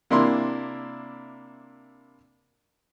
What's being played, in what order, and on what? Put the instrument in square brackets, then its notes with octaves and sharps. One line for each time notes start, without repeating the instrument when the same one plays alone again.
[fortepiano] C3 A#3 D4 E4 C6